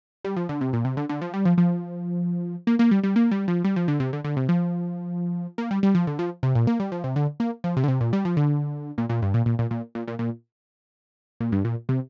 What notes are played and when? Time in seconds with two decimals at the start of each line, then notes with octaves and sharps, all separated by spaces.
0.24 G3
0.36 F3
0.49 D3
0.61 C3
0.73 A#2
0.85 C3
0.97 D3
1.09 D3
1.21 F3
1.34 G3
1.45 F3
1.58 F3
2.67 A#3
2.79 A#3
2.91 G3
3.04 G3
3.16 A#3
3.31 G3
3.48 F3
3.64 G3
3.76 F3
3.88 D3
4.00 C3
4.13 D3
4.24 D3
4.37 C3
4.49 F3
5.58 A#3
5.71 G3
5.83 G3
5.95 F3
6.07 D3
6.19 F3
6.43 C3
6.55 A#2
6.67 A#3
6.80 G3
6.92 F3
7.04 C3
7.16 D3
7.40 A#3
7.64 F3
7.77 C3
7.84 D3
7.88 C3
8.01 A#2
8.13 G3
8.25 F3
8.37 D3
8.98 A#2
9.10 A#2
9.22 G2
9.34 A#2
9.46 A#2
9.59 A#2
9.71 A#2
9.95 A#2
10.08 A#2
10.19 A#2
11.40 A#2
11.52 G2
11.65 A#2
11.89 C3